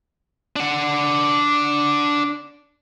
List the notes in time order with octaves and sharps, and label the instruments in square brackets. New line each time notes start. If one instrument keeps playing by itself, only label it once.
[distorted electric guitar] D4 F#5